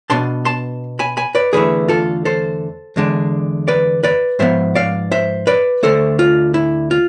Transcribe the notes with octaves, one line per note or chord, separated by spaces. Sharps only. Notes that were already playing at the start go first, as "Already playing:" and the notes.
B2 B3 D4 A5 C6
A5 C6
G#5 B5
G#5 B5
B4 D5
E2 D3 A3 E4 G#4 B4
F4 A4
A4 C5
E2 D3 G#3 D4
B4 D5
B4 D5
G#2 F3 B3 C5 E5
D5 F5
C5 E5
B4 D5
D2 D3 A3 A4 C5
F4
E4
F4